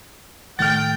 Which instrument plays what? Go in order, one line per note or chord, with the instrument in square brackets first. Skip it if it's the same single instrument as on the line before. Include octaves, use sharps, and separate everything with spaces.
[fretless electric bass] A2 D#3 A3 [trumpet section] G5 [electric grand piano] F6 A6